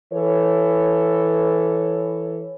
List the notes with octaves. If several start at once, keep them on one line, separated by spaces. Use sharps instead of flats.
E3 A4 C#5